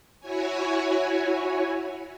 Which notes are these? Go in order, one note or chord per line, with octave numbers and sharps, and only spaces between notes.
E4 F#4 C#5 G#5